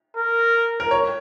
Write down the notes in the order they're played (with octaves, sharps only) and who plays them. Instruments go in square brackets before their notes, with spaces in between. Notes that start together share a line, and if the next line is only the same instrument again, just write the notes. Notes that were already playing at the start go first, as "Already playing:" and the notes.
[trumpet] A#4
[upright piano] A#4
C#5